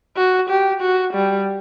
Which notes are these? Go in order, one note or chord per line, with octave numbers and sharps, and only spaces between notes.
F#4
G4
F#4
G3